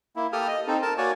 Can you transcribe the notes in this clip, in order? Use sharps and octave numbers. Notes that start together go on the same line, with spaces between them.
A#3 E4
A#3 G4 A4 D#6 F6
D#5
C4 D#4 A4
A#4 A5
A#3 F#4 C#5 D5 G#5